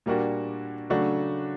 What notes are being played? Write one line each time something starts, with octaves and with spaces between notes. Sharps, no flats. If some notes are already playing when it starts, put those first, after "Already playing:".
A#2 G3 A#3 D4 F#4
C#3 F#3 A3 D4 F#4